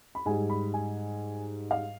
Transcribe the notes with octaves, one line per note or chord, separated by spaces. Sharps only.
B5
G#2 G3 G#5
B5
G#5
F5